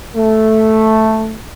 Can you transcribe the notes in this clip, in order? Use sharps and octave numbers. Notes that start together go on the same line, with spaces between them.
A3